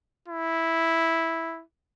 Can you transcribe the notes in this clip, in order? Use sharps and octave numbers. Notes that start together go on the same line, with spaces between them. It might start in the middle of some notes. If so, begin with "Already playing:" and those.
E4